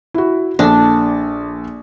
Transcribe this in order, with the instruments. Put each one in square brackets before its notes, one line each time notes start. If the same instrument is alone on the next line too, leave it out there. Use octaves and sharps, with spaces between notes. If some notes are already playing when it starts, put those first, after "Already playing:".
[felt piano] E4 F#4
[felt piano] A#1 A4 [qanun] D4